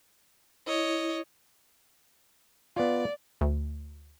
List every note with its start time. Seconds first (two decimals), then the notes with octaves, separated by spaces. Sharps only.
0.67 E4 C#5 D#5
2.76 B3 F4 D5
3.41 D2